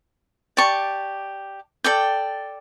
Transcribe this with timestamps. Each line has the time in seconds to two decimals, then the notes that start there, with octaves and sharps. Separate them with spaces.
0.57 G4 D5 A5 C#6
1.84 A4 D5 G5